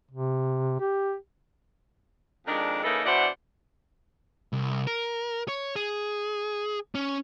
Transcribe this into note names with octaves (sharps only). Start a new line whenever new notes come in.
C3
G4
F2 D#3 G#3 D4
C#3 E3 A#3 D#4 A4 B4
B2 E3 D4 C5 D5 F#5
C2
A#4
C#5
G#4
C#4